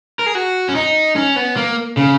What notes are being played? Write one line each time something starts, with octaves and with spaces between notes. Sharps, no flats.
A#4
G#4
F#4
C#4
D#4
C#4
B3
A#3
C#3